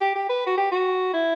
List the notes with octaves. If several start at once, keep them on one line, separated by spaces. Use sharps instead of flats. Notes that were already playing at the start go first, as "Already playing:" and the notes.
G4
G4
B4
F#4
G4
F#4
E4